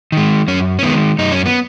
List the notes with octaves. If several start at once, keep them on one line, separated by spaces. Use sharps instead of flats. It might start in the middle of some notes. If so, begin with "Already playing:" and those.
D#3 G#3
F#2 C#4
C#4
D#3 G#3 B3
F#2 D#4
C#4
B3